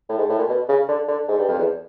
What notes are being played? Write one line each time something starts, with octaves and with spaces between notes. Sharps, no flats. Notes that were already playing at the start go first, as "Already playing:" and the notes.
A2
G#2
A2
A#2
B2
C#3
D3
D3
G#2
G2
F2
E2